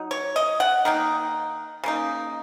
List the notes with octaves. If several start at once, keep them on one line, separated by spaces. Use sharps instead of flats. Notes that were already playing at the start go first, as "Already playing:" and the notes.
Already playing: F#3 D#4
C#5
D#5
F#5
D#3 A#3 D#4
C#3 A#3 D#4